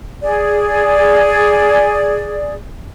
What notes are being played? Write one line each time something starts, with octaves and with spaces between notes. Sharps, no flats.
G#4 D5